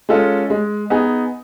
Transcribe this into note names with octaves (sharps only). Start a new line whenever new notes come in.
G#3 C#4 F4 A4
G#3
B3 D#4 G#4